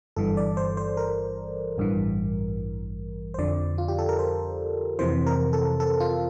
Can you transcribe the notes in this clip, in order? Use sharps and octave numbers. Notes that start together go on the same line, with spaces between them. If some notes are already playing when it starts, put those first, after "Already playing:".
G1 G2 E3 A4
D5
C5
C5
A#4
A1 G2 E3
C5
F2 D3 F3 D5
F4
G4
A4
A#4
C5
F2 C3 E3 C5
A#4
A4
A4
F4